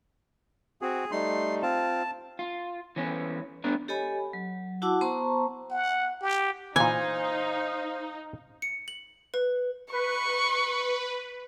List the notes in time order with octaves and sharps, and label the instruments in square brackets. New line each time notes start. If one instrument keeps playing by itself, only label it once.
[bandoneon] C4 F#4 [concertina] G#4
[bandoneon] G3 A3 D#4 [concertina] C6
[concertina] C4 F4 [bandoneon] A5
[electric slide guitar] F4
E3 B3 C#4
A3 B3 D4 A#5
[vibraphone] G4 A4 C#5 D#5 G#5 B5
F#3
E4 F#4 F#5 A5 D6 E6
B3 C5 A5 A#5 C6 C#6
[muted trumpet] F#5
G4
[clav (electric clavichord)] A#2 E3 [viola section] D#4 [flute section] C5 F5 [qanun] G#5
[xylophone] C#7
F#7
B4
[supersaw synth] B4 [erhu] C#6